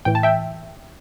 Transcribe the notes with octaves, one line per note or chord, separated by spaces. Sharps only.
A2 E3 G5
A5
E5 G5